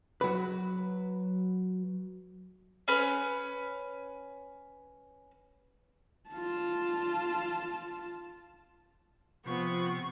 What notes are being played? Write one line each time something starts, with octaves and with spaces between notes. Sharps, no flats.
F#3 B4
C#4 B4
F4 A5
C3 F3 B3 C#6